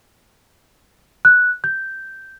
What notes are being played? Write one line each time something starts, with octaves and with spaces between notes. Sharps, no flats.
F#6
G6